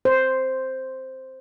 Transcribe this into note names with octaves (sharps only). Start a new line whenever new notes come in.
C5